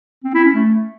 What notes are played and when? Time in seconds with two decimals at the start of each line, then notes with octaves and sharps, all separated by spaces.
0.24 C4
0.34 E4
0.44 C#4
0.54 A3